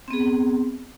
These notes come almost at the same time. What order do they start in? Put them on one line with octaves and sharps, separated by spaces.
C4 B3 G#4